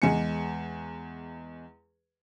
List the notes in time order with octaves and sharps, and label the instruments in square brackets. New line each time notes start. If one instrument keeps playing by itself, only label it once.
[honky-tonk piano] E2 G#3 G#5 C#7